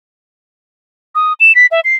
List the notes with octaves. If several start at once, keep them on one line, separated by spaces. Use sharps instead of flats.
D#6
E7
B6
E5
C7